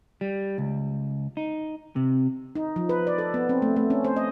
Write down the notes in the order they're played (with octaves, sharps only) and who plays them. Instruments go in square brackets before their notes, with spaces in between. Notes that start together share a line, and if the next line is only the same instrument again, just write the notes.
[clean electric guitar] G3
C#2
D#4
C3
[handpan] D#4
F3
B4
D5
A4
B3
C4
A3
A3
C#4
C5
D#5